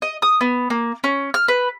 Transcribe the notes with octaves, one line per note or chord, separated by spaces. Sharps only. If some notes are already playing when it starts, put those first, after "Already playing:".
D#5
D#6
B3
A#3
C#4
F6
B4